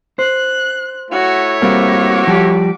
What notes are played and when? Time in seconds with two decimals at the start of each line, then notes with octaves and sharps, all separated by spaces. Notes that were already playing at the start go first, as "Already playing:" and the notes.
0.19 C5 F#6
1.11 A3 E4 F#4 C#5
1.62 G3 A#3 C4 F#4 D6
2.27 F3 G3 G4